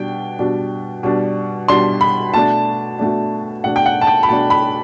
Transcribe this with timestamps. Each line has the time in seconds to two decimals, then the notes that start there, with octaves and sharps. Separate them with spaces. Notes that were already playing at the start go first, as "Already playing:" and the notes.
Already playing: B2 G3 D4 G5
0.39 B2 G3 D4
1.03 B2 G3 D4
1.68 B2 G3 D4 C6
2.01 B5
2.34 B2 A3 D4 A5
2.99 B2 A3 D4
3.64 B2 A3 D4 F#5
3.76 G5
3.86 F#5
4.01 A5
4.07 G5
4.23 B5
4.29 B2 A3 D4 A5
4.50 B5